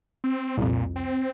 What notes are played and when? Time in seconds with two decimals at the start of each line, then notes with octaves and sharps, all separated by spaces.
0.24 C4
0.57 C2 F2 A#2
0.96 C4